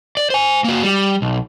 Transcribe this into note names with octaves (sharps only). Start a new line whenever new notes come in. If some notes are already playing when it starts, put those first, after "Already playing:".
D5
C5 G#5
A#3 F#4
G3
B1